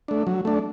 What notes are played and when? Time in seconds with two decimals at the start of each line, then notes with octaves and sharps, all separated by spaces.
0.08 A3 D4
0.27 F#3
0.45 A3 D4